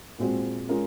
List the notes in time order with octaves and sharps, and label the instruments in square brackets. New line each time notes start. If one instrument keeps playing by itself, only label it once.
[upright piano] A#2 G#3 C4 F#4 C5
G#3 C#4 F4 A#4